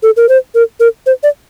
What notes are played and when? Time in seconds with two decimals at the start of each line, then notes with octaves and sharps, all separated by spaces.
0.03 A4
0.17 A#4
0.29 C5
0.55 A#4
0.80 A#4
1.06 C5
1.23 D5